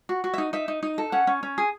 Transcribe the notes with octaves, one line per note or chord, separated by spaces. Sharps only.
F#4
F#4
E5
D#4
D#4 E5
D#4
D#4
A4
C#4 F#5
C#4
C#4
G#4